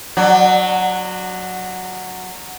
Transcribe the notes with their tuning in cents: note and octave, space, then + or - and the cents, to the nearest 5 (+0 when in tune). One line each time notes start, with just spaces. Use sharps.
F#3 -5 D4 +20